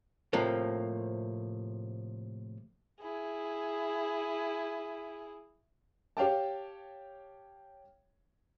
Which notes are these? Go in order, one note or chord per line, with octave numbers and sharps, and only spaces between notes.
A2 C3 F3 A3 A#3
E4 G#4
G4 C#5 F5 G5 A5